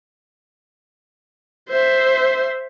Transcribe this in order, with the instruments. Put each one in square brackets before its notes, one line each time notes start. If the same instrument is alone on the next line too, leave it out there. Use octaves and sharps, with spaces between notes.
[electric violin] C5 E5